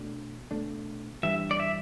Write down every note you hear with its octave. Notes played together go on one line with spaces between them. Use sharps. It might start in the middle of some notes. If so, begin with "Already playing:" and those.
Already playing: B2 A3 D4
B2 A3 D4
G2 E3 G3 D4 E5
D5
E5